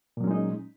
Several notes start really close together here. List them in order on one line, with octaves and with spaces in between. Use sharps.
A#2 F#3 C#4 G#3 D#4